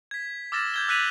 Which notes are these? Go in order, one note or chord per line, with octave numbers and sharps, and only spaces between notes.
G#6 B6
D6 E6 F6 A6 A#6 E7
G6 G#6 G7
E6 F#6 B6 D#7 F7 F#7